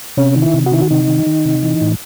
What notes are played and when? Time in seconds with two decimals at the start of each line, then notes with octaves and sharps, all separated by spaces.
0.17 C3 C#4
0.36 D#3
0.42 E4
0.53 C3
0.66 F#4
0.72 D#3 E4
0.81 F#4
0.90 C3 D#4
1.08 D#3
1.26 D#3
1.45 C3
1.63 E3
1.81 A2